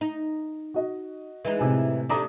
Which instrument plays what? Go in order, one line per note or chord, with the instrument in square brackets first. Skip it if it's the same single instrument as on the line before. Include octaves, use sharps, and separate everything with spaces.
[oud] D#4
[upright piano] F#4 D#5
[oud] E3 G#3 D#4
[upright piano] A2 C3 G#5
[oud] C3 A3 D4 [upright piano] D5 A#5 D#6